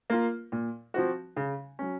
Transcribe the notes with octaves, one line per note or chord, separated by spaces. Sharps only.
A#3 F4 A#4
A#2
F3 C4 F#4
C#3
F#3 C#4